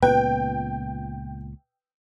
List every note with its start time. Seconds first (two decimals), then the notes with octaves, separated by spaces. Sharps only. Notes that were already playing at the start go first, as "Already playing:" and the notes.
0.03 C#2 A#2 B3 B4 G5